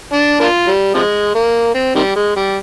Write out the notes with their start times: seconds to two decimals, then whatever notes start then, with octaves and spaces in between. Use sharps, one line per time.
0.13 D4
0.40 A#3 D4 F4
0.67 G3
0.94 C3 F3 G#3
1.35 A#3
1.74 C4
1.95 C3 D#3 G3
2.16 G#3
2.36 G3